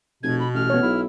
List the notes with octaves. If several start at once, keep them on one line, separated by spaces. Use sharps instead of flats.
F1 B2 G#6
B5
A1 F6
B3 C#5
B1 E4